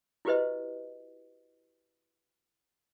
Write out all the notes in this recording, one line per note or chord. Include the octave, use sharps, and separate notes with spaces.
E4 F#4 G4 B4 C5 D#5